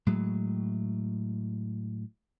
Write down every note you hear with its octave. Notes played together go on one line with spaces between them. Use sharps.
A2 F#3 G#3